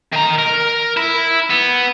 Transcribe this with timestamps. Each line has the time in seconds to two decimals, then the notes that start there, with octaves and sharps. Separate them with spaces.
0.13 D#3 A#5
0.39 A#4
0.97 E4
1.50 B3